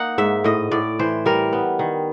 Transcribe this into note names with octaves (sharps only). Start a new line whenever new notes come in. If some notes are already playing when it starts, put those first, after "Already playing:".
Already playing: A#3 D#4 F#5
G#2 E5
A2 D#5
A2 D5
E3 C5
G3 A#4
B3
D#3